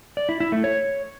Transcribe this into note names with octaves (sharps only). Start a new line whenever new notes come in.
D5
E4
E4
A3
C#5